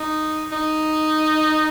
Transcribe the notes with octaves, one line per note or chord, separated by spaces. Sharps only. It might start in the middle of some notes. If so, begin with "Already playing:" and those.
Already playing: D#4
D#4